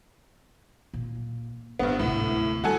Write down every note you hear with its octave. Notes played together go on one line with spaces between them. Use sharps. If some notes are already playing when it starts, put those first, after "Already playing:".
A#2
G#1 G2 B3
D2 A2 C3
G3 F#4 A4 G#5